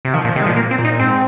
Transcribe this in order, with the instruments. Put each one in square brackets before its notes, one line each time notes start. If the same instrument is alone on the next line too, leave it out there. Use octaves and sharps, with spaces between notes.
[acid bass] C3
[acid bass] D#3 [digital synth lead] F3
[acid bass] A#2 [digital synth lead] F3
[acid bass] C3 [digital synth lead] D#3
[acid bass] G#3
[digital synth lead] A#2 [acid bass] F3
[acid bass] A#3
C4
[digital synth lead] A#2
[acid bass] D#4
[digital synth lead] G#2 [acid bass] C4